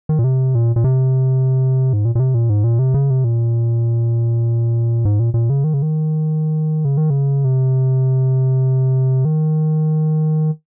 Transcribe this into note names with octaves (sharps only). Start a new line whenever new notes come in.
D#3
A#2
C3
A#2
A#2
C3
G#2
A#2
A#2
C3
A#2
G#2
A#2
C3
C#3
C3
A#2
G#2
A#2
A#2
C#3
D#3
C#3
D#3
C#3
D#3
C#3
C3
D#3